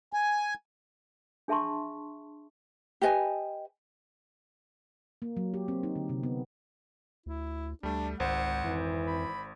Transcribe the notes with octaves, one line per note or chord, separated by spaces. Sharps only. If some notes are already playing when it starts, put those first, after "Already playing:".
G#5
D4 G#4 E5 A5 C6 C#6
G4 B4 D#5 G#5
A#3
F#3
G4
C4
D#4
D3
C3
B3
D2 E4
D2 G3 A3 D4
G#1 C#2 C5 F#5
F2 E3
B5